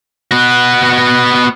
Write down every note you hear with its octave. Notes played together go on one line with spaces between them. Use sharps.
B3 F#4